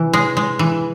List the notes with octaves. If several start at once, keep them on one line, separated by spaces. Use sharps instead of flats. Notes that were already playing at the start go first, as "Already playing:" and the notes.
Already playing: C3 E3
G#3
G#3
E3